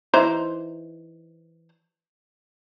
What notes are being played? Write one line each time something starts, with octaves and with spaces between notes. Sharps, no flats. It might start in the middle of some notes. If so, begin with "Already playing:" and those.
E3 D#4 C5